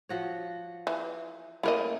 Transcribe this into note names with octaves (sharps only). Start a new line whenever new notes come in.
F3 F#4 C#5
E3
A3 A#3 C#4 E4 A#4 D#5